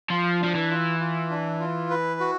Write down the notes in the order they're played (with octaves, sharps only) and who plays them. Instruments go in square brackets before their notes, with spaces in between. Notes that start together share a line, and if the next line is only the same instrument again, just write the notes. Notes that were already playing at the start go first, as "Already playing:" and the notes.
[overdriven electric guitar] F3 [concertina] F4
[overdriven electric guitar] F3 [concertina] D4
[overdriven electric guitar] E3
[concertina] F4
F4
D4
F4
B4
F#4